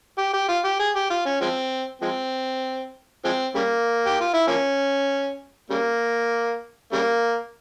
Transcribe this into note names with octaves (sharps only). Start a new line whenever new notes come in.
G4
G4
F4
G4
G#4
G4
F4
C#4
F3 G#3 C4
F3 G#3 C4
F3 G#3 C4
C#3 G3 A#3
G4
F4
E4
F3 A#3 C#4
C#3 G3 A#3
C#3 G3 A#3